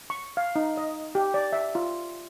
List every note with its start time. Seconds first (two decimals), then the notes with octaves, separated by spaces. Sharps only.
0.10 C#6
0.37 F5
0.56 D#4
0.77 D#5
1.15 G4
1.34 D5
1.53 E5
1.75 F4